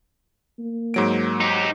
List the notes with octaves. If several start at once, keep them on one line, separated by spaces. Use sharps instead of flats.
A#3
G#2 F#3 D7
D#4 G4